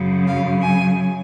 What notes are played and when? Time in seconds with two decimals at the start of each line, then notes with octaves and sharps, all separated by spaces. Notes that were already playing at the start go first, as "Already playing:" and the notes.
Already playing: F#2 C#3 F#3
0.27 F5
0.62 G#5